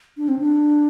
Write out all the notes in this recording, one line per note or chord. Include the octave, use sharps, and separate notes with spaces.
D4
C4
D4